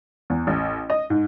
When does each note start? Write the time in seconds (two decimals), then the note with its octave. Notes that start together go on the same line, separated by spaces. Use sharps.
0.30 E2
0.47 A1
0.90 D#5
1.10 G#2